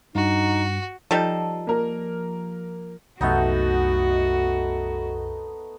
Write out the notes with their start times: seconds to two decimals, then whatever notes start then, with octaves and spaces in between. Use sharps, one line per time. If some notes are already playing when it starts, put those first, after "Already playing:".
0.15 G2 D#4 F#4
1.11 F3 G3 D#4 A4
1.67 A#3 A#4
3.21 C2 F#2 A3 B3 D#4 F#4 D#5